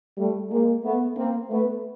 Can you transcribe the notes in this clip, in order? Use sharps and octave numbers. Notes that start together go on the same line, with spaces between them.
G3 A3
G#3 A#3
A3 B3
A#3 C4
A3 B3